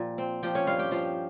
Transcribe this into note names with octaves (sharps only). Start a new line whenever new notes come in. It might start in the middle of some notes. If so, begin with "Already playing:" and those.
Already playing: A#2 F3 G4
C4
F3 G4 G5
C#4 C#5
G2 F4 F5
G4 G5
F3 F4 F5